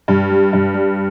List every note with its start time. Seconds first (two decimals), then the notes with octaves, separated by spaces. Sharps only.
0.08 G2
0.31 G3
0.53 G2
0.74 G3